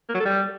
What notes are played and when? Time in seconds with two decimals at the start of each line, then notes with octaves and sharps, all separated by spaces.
0.09 A#3
0.15 F#3
0.20 A4
0.25 G3